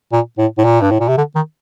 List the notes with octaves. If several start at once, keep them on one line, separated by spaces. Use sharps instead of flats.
A#2
A2
A2
A#2
G2
A2
A#2
C3
D3
D#3